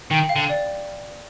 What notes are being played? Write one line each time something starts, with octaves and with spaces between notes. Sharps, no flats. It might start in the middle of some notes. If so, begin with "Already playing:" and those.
D#3 G5
F5
D3
D5